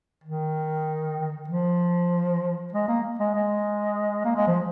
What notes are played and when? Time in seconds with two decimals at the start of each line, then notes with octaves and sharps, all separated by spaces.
0.24 D#3
1.48 F3
2.72 G#3
2.88 A#3
3.19 G#3
3.34 G#3
4.25 A#3
4.36 G#3
4.47 F3